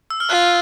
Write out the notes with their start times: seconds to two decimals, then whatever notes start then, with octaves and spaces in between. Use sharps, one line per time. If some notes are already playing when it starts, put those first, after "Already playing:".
0.10 E6
0.20 F6
0.30 F4 F#6